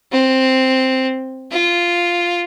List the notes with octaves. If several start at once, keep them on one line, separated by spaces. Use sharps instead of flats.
C4
F4